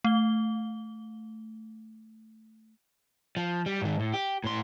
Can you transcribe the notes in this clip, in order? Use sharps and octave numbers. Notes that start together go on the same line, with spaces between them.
A3 G7
F3
G3
G#2 D#3
A2
G4
A2 C6